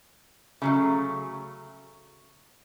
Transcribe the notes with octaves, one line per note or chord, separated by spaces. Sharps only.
C#3 F#3 A3